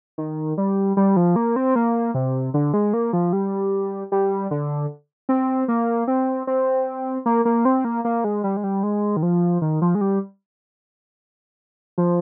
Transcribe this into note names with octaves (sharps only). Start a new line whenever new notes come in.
D#3
G3
G3
F3
A#3
C4
A#3
C3
D3
G#3
A#3
F3
G3
G3
D3
C4
A#3
C4
C4
A#3
A#3
C4
A#3
A#3
G#3
G3
G#3
G3
G#3
D#3
F3
D#3
F3
G#3
G3
F3